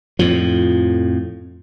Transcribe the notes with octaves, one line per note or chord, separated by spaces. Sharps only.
F2 A2 F3